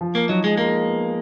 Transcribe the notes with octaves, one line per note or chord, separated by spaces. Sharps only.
F3
A#3
F#3 D#4
G#3
G#3 A#3
B3